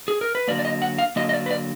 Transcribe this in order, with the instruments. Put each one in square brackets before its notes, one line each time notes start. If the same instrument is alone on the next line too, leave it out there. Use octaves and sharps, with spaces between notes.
[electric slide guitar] G#4
A#4
B4
D3 F#3 A#3 D5
D5
D#5
F#5
F5
D3 F#3 A#3 D#5
D#5
D5
B4
D5